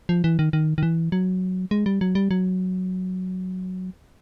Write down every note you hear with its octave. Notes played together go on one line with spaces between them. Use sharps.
F3
E3
D#3
D#3
D#3
E3
F#3
G#3
G3
F#3
G3
F#3